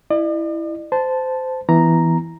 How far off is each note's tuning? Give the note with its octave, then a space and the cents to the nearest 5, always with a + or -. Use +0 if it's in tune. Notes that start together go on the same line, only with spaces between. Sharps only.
E4 +0 D5 +45
C5 -20 A5 -5
E3 +0 B3 +0 A#5 +0